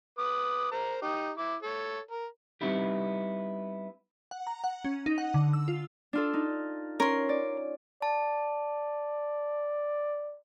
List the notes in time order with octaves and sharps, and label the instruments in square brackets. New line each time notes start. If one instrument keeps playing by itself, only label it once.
[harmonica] B4 D6 D#6
A#4 C5 A#5
D#4 G4
E4 D6
A4 C#5
A#4
[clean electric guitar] G3 B3 C4 D#4 E4 G4
[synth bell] F#5
A#5
F#5
C#4
D#4
F#5
D3
E6
F4
[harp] D4 F4 A4
D#4
[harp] C#4 [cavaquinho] A#4 C6
[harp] D5
[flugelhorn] D5 [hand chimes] A5